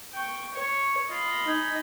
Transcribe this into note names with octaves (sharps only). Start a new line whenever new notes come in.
G5 C#6
C#5 C#6
F4 D#5 B5
D#4 G#5